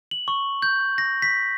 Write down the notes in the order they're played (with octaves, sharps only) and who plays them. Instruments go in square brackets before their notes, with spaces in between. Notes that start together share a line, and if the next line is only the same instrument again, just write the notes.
[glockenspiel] F#7
C#6
G6
A#6
B6